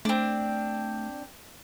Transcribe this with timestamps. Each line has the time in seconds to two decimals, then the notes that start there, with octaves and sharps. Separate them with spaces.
0.05 A3 C4 D4